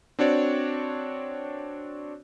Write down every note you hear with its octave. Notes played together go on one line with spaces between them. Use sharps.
C4 D4 F#4 C#5 D5